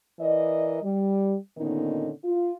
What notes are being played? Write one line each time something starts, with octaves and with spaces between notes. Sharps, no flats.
E3 A#4 D5 D#5
G3
A#2 D3 D#3 B3 C#4 D#4
F4